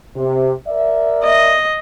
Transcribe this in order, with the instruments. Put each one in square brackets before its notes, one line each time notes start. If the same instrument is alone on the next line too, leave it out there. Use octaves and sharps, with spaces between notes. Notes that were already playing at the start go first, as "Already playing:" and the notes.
[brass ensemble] C3
A#4 D5 E5
[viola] D#5